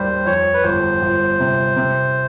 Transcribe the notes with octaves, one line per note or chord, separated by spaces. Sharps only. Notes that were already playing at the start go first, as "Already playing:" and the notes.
Already playing: D#2 G3 C5
F2 C#5
B4
G1 C5
G1
C3
C3